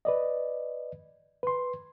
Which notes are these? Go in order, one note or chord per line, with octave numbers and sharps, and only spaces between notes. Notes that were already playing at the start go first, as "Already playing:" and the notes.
B4 D5 D#5
B4 C6